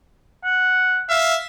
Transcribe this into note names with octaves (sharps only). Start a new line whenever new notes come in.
F#5
E5 F5